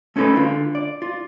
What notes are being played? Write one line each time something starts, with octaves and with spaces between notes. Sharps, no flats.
A3 C#4 D#4 A4 B4 B5
D3 F4
D5
F4